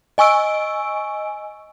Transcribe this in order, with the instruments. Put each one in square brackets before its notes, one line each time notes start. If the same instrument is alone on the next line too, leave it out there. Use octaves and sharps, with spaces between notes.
[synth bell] D#5 G#5 C#6 E6 D7